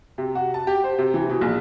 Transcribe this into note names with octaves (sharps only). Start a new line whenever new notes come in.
C3
F#4
A5
G4
C5
C3
E3
B2
A#1